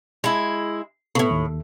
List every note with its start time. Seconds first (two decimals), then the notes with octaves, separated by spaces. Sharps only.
0.24 G#3 E4
1.15 A2 C#3 B3 A4
1.31 D#2